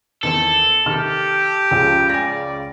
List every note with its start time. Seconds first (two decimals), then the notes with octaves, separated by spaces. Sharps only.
0.23 E2 D#3 C4 A4
0.86 C3 D#3 G4 F6
1.71 C#2 C#3 F3
2.09 D5 G#5 A#6